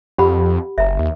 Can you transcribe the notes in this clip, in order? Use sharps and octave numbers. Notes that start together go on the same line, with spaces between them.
F2 G4 F#5 B5
F#1 E5 A#5
D#2